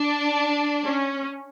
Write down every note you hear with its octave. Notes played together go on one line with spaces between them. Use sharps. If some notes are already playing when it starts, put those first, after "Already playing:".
Already playing: D4
C#4